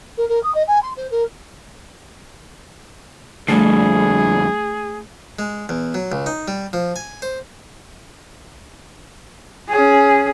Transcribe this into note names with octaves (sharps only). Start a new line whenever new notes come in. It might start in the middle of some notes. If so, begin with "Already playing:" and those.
A#4
A#4
D#6
D#5
G#5
C6
C5
A#4
F2 D3 G3 A3 G#4
G#3
E2
F#3
C#2
D#4
G3
F3
G#5
C5
C#4 G#4